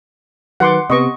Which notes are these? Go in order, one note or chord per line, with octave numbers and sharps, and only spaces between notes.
D#3 F#3 B4 F#5 C6 D6
C3 B3 D#5 C#6